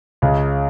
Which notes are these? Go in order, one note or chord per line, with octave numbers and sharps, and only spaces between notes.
C#2 C#3